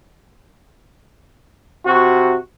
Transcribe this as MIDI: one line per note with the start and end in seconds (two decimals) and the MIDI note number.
1.85 2.36 48
1.85 2.36 66